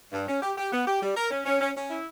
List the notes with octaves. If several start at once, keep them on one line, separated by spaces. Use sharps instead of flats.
G2
C#4
G4
G4
B3
G4
G3
A#4
C#4
C#4
C#4
C#4
E4